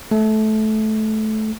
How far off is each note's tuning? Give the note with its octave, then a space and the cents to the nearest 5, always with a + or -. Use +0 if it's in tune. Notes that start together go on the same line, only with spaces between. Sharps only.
A3 -20